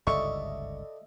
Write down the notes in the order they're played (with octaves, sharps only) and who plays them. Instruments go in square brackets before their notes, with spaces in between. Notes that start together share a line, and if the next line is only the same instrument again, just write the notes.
[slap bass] G1 C#2 G#2 [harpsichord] D3 [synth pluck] D#5 E5 [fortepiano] C#6